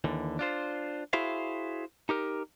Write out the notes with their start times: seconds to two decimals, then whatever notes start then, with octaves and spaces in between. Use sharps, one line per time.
0.04 D#2 D3 E3
0.39 D4 F4 C5
1.13 E4 F#4 G#4 C5 E5 F5
2.09 D#4 G4 A#4